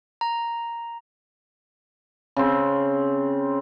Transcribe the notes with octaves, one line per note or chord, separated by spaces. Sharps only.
A#5
C#3 C4